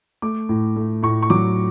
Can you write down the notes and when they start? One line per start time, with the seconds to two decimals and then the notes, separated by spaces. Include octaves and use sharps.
0.22 A3 D6
0.49 A2
0.76 A3
1.03 A2 C#6
1.22 C#6
1.30 F#3 D6